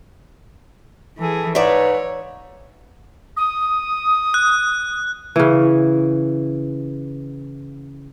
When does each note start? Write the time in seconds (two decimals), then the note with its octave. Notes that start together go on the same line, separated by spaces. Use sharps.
1.18 E3 G#4 A4
1.55 G#2 B4 C#5 D5 E5
3.37 D#6
4.34 F#6
5.36 C#3 E3